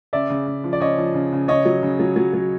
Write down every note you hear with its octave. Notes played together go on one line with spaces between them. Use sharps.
C#3 D5 E5
C#3
C#3
F3
D5
C#3 C#5 D#5
F3
C#3
C#3
C#3 C#5 D#5
F#3
C#3
F#3
F#3
F#3